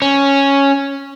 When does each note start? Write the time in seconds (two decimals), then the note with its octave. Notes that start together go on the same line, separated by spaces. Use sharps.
0.02 C#4